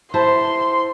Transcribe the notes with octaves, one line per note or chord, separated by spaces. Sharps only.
E4 C5 A5 C6